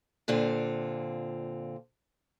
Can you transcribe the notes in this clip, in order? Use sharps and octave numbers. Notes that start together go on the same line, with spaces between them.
A#2 D3 C4 F4